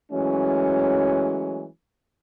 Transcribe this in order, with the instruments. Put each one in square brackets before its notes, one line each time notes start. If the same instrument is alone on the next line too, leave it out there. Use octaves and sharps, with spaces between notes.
[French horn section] E3 F#3 G#3 A3 C#4